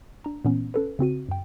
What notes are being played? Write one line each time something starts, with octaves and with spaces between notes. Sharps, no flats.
D4 A#5
A#2 E3 B3 C#4
C#4 A4 B4
C#3 C4 F#4 D#7
F#2 G5